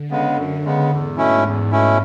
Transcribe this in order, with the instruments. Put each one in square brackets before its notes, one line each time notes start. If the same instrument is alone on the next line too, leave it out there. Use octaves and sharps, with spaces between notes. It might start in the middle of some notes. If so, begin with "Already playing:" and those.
Already playing: [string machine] D3
[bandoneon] C#3 G#3 B3
F#2
C#3 G#3 B3
[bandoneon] E2 [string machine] G#2
[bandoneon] B2 A3 C#4 E4
E2
B2 A3 C#4 E4